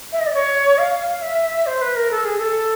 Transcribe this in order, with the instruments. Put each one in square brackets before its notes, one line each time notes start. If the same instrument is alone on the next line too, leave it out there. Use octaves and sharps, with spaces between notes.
[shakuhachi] E5
D#5
D5
C#5
F5
E5
C5
B4
A#4
A4
G#4
A4